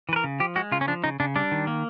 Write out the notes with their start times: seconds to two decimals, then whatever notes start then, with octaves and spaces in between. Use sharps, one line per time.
0.09 E3 B4
0.16 A#4
0.24 C#3
0.40 F3 G4
0.56 G#3 F#4
0.72 C#3 F4
0.81 C#4
0.88 F3 D4
1.04 C#3 D#4
1.20 C#3 D4
1.36 G3 D4
1.52 D#3
1.67 A#3